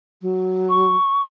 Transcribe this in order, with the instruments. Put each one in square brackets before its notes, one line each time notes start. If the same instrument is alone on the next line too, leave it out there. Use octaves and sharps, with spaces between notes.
[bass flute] F#3
[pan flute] C#6